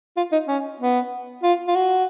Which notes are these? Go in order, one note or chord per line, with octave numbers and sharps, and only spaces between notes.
F4
D#4
C#4
B3
F4
F4
F#4